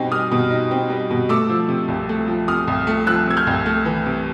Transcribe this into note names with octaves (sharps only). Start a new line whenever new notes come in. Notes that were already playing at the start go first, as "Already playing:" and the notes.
Already playing: B2 G3 C4 D#4
G3 D#6 F6
B2
D#4
C4
G3
B2
A3 D6 E6
F3
C3
C2
A3
F3
C3 D#6 F6
C2
A3
F3 E6 F#6
C3 G#6
F6 G6
C2
A3
E3
C3